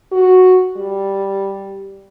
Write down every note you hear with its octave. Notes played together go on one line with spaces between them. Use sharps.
F#4
G3